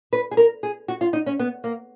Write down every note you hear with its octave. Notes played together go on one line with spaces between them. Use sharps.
B4
G#4
A#4
G#4
F#4
F4
D#4
C#4
B3
A#3